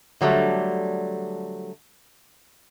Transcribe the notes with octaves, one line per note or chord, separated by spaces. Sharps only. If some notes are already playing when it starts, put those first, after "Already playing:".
D3 F#3 G3 A3